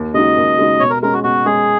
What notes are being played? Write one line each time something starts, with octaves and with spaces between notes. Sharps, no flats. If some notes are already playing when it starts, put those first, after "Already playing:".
Already playing: D#2
C#3 G#3 D#4 F#4 D#5
D#2
C#3 G#3 D#4 F#4
B2 C#5
A#4
G#3 C#4 A#4
F#4
B2 F#4
G#3 C#4 G#4